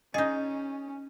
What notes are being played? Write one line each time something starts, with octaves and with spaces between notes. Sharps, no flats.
C#4 D#4 G#4 D#5